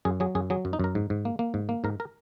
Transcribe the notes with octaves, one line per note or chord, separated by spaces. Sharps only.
F#2 G#4
F#3 G#4
F#2 G#4
F#3 G#4
F#2
D#4
F#2 A#4
G#2
G#2
A#3
A#3
G#2
A#3
G#2 A#4
A#4